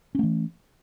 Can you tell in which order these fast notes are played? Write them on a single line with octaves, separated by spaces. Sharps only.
C#4 A3 E3